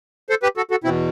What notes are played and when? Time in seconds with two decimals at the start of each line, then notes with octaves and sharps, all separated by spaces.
0.30 A4 C5
0.43 G4 B4
0.57 F#4 A4
0.71 F#4 A4
0.84 E2 B2 C4 E4